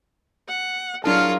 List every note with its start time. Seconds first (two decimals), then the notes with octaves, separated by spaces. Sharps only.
0.49 F#5
1.04 F#3 D4 E4 F4 G#4 A#4 A5 F6